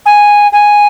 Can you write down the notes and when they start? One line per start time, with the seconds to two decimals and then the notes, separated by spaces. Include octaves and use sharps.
0.06 G#5
0.53 G#5